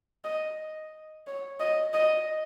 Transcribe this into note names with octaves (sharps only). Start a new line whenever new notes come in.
D#5
C#5
D#5
D#5